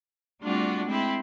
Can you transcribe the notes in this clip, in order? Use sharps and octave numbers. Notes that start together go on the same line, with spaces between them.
G3 A3 C4 D4 F4 F#4
G#3 C4 E4 G4